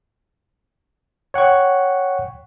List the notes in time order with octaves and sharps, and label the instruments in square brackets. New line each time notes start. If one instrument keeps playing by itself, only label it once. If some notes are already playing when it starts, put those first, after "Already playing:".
[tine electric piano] C#5 F#5 G5 C#6